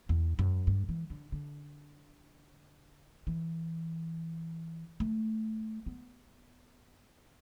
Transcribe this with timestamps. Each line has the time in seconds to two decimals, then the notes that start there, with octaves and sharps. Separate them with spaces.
0.09 E2
0.39 F#2
0.67 G2
0.89 E3
1.10 D3
1.32 D3
3.27 E3
5.00 A3
5.86 B3